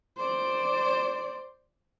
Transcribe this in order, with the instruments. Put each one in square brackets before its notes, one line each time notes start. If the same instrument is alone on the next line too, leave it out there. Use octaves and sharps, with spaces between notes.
[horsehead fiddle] C5 D5